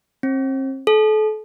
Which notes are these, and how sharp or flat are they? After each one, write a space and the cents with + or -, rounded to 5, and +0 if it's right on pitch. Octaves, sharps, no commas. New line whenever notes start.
C4 +40
A4 -35